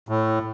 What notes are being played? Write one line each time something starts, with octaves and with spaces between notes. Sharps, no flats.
A2